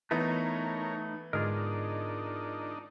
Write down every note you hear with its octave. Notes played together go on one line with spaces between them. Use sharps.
E3 A3 B3 D#4 A#4 C#5 B5
G#2 D3 D4 D#4 F4 G#4 A#4 D#5